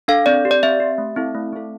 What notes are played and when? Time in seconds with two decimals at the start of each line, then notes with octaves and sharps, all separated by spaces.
0.08 D4 A4 F5
0.26 C4 D5
0.45 G4
0.51 D5
0.63 C4 E5
0.80 G4
0.98 A3
1.16 C4 E4 A4
1.35 A3
1.53 C4 E4 A4